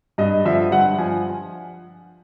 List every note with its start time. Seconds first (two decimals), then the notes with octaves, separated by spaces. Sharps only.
0.18 G2 D#5
0.45 D3 F3 E5
0.71 G2 F#5
0.98 F3 G#5